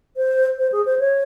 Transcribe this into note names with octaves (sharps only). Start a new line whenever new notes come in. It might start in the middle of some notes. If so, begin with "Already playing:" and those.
C5
C5
G#4
C5
C#5